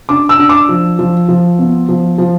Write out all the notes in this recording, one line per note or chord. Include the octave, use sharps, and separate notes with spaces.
D4 D6
E6
D4
D6
F3
F3
F3
B3
F3
F3